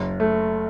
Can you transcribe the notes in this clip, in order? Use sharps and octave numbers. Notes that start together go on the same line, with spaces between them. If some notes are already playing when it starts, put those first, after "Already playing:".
Already playing: F#1
A3